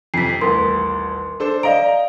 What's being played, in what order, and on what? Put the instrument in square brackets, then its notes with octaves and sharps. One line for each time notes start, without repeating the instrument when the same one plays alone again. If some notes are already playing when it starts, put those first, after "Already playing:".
[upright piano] F2 C3 [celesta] B6 C7
[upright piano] D#1 A1 [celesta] A#4 C6
[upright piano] D4 A4 C5
[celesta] D5 F5 D7 [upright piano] D#5 A#5